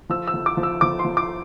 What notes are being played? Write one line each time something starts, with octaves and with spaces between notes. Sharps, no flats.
F3 E6
E6
F3
D6
F3
E6
F3 D6
C6
F3
D6